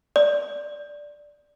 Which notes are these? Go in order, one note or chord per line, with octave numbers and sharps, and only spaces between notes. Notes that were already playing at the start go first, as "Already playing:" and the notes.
D5